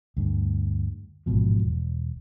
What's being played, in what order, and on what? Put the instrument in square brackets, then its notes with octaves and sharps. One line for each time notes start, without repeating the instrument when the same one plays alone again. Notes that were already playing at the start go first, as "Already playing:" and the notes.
[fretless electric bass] D2 G2
A1 G#2 B2 F3
E1